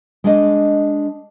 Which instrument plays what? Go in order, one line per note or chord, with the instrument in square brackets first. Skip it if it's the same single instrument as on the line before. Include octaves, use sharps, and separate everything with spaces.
[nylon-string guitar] G#3 D4 D#5